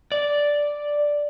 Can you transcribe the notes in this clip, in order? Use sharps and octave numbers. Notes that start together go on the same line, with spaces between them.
D5